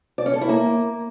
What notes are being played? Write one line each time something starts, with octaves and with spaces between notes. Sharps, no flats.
D5
C#4
A4
E4
A#3